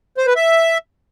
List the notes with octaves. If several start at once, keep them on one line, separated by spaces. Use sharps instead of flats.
C5
B4
E5